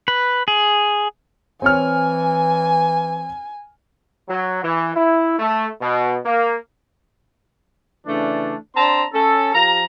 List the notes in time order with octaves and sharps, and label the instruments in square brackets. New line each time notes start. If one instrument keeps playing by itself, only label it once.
[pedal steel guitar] B4
G#4
[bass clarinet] E3 [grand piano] C4 C#5 F6 [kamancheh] G#5
[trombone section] F#3
E3
E4
A3
B2
A#3
[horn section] C#3 E3 A3 D4
C4 D4 A5 A#5 C6
C#4 A4
F3 G4 A#5